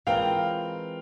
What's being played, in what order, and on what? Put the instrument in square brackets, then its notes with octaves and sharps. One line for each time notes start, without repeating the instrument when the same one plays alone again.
[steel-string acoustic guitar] E3 G#3 C4 F4 A#4 [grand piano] F5 G5